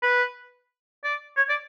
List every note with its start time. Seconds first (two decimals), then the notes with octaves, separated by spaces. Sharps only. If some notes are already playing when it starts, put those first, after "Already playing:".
0.02 B4
1.04 D5
1.37 C#5
1.49 D5